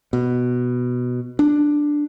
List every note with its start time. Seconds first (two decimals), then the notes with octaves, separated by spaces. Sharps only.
0.13 B2
1.39 D4